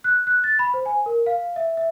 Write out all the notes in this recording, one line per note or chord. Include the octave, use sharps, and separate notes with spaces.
F#6
F#6
A6
B5
C5
G#5
A#4
F5
E5
E5